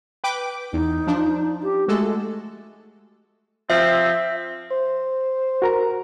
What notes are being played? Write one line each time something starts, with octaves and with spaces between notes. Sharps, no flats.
B4 G5 D6
E2 D#4
F3 D4
G4
G#3 A3 F#4 A4
F3 C4 E5
C5
F#4 A#4 A#5